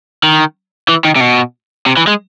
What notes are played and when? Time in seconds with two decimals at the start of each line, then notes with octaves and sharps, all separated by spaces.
0.23 D#3
0.89 E3
1.05 D#3
1.16 C3
1.21 B2
1.86 C3
1.97 E3
2.07 G#3